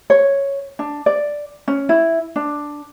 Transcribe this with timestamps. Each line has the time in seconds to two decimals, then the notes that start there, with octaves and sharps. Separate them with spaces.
0.10 C#5
0.79 D4
1.06 D5
1.68 C#4
1.89 E4
2.36 D4